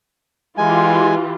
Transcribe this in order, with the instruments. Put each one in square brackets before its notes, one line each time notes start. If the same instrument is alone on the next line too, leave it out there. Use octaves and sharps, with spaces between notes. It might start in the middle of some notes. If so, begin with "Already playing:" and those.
[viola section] E3 F4 G4 [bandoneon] G#3 G#5